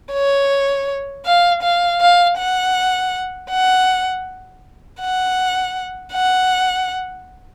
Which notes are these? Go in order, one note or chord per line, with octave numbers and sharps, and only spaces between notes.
C#5
F5
F5
F5
F#5
F#5
F#5
F#5